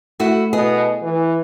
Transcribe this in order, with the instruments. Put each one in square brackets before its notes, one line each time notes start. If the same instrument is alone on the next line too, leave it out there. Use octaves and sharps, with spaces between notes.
[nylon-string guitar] A3 E4 F#4
[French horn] B2 [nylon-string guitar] G#4
[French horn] E3